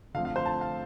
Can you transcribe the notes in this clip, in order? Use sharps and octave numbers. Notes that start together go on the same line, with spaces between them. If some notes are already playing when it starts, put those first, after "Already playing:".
D3 F3 A3 C4 F5
F5
C5
A5
F5